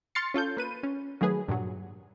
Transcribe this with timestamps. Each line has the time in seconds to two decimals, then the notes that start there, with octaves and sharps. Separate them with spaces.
0.15 C6 F6 A6 C7 C#7
0.34 C#4 F4 A4 G6
0.57 A#3 B4 D#7
0.83 C#4
1.21 D#3 F#3 A3 G#4 B4
1.48 G2 A#2 F#3